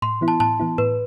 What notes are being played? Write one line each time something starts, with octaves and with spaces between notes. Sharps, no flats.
A2 C6
E3 B3 E4
A5
A2 A5
E3 B3 E4
A2 B4